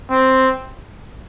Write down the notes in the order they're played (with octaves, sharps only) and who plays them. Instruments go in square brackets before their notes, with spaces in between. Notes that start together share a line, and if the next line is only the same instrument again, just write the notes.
[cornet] C4